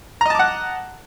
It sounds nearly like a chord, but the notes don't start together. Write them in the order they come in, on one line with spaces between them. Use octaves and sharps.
A#5 D#5 A5 D6 F#5